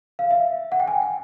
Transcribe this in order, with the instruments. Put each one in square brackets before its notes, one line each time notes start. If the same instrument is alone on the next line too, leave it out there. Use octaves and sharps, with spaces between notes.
[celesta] F5
E5
F#5
G5
G#5
G5